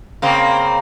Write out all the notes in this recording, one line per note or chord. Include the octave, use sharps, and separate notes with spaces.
C#3 A#3 C4